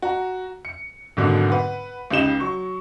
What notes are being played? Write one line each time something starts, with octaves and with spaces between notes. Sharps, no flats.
F#4 A#5
C#7
G#1 D#2 G#2 B2 D3 F#3
B4 F#5
C#2 C#3 D#4 G4 E7 G7
F#3 C#6